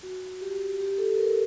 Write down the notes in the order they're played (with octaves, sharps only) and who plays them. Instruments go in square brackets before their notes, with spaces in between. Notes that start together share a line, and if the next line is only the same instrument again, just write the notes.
[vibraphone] F#4
G4
G4
A4
A#4